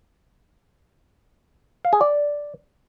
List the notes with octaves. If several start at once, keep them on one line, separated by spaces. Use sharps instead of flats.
F5
G#4
D5